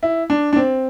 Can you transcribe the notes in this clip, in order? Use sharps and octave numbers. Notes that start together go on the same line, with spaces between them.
E4
D4
D4
C4